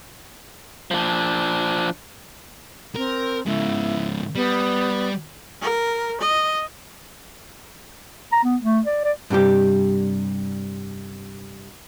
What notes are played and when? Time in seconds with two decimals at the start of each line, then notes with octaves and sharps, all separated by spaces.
0.91 F3 D4
2.96 C4 A#4
3.46 G#2 C#3 E4
4.35 G3 B3
5.62 A#4
6.21 D#5
8.32 A#5
8.44 B3
8.62 A3
8.85 D5
9.04 D5
9.30 G2 C3 G3 G4